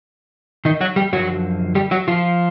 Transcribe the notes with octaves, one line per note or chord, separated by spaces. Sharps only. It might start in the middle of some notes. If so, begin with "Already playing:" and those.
D#3 D#4
F#3 F#4
G3 G4
F#2 D3 F3 F#3 F#4
G3 G4
F#3 F#4
F3 F4